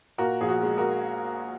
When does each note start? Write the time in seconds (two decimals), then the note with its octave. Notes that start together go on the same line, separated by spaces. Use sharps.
0.18 A#2 F#4 A#4
0.41 A#1 G#4
0.48 F#4
0.63 G#3
0.78 F#4 A#4